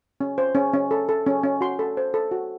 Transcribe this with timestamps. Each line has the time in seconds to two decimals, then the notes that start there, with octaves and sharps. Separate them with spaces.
0.21 C#4
0.38 C5
0.55 C#4
0.74 C#4
0.91 A4
1.09 A4
1.26 C#4
1.43 C#4
1.61 F#4 C6
1.79 A4
1.97 C5
2.14 A4
2.31 F#4